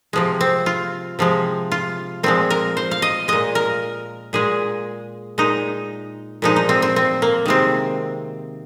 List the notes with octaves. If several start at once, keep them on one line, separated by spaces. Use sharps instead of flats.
C3 F3 G#3
C4
F4
C3 F3 G#3
F4
A#2 F3 G#3 C4
A#4
C5
F5
D#5
A#2 G#3 D#5
A#4
A#2 G#3 G#4
A#2 G#3 D#4
A#2 F3 G#3 D#4
D#4
C4
C4
C4
A#3
C3 D#3 G#3 C4